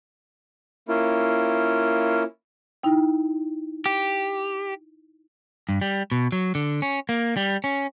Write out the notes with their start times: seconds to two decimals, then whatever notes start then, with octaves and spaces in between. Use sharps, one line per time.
0.88 A#3 C#4 E4 F4
2.83 D#4 E4 G5
3.86 G4
5.69 G2
5.81 G3
6.12 B2
6.32 F#3
6.55 D3
6.82 C#4
7.09 A#3
7.37 G3
7.64 C#4